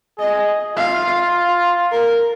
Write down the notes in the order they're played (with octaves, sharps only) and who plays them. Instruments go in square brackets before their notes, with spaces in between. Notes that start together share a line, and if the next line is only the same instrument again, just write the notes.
[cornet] G#4 [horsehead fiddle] D#5
[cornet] F4 [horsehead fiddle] F5
[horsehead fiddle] A#4